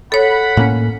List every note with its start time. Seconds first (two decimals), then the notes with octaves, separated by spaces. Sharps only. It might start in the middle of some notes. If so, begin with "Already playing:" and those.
0.12 A4 C#5 F#5 B5
0.57 A2 A#3 C#4